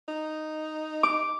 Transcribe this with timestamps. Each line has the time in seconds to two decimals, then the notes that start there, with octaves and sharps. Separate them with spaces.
0.08 D#4
1.03 D6